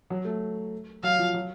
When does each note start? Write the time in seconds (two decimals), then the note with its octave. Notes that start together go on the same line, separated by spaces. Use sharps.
0.10 F#3
0.25 A3
1.03 F#3 F5
1.19 F3
1.34 F#3